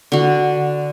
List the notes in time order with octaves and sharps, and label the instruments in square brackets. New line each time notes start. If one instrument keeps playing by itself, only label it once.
[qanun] D3 F#4